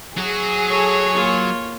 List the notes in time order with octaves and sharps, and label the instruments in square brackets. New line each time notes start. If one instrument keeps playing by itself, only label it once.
[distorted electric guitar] F#3 F#4 [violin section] G#4
[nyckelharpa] A4 [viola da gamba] C#5
[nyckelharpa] A#3 F4